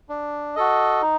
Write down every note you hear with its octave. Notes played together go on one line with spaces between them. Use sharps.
D4
F#4 A4 D#5
D#4